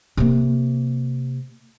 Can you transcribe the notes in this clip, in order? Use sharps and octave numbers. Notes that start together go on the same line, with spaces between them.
C3 A#3